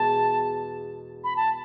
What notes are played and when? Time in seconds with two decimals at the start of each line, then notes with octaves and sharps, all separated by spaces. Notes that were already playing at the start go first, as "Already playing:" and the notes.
Already playing: E2 B2 G#3 A5
1.24 B5
1.36 A5